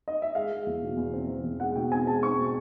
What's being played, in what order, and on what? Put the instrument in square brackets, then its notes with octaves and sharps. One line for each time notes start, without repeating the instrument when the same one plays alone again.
[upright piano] D#5
E5
G#3 F5
G#3
E2
B2
E2
C4
E2
E2
G#3 F#5
B2 G5
C4 G#5
G#3 A5
C4 C#6
B2